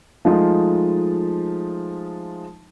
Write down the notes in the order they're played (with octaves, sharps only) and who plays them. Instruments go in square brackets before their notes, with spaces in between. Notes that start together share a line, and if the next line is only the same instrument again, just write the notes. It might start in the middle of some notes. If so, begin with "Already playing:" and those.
[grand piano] F3 G#3 A3 D#4 F4